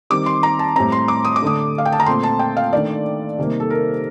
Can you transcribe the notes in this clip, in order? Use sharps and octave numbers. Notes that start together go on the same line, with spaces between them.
D#3 G3 C4 D6
C6
A#5
A5
A2 G3 C4 A#5
C6
D6
D#6
D6
D3 A3 D4 D#6
F5
G5
A5
A#5
A#2 A3 C4 C6
A5
G5
F5
D#3 A3 D4 D5
C3 D#3 G3 A#3
A4
A#4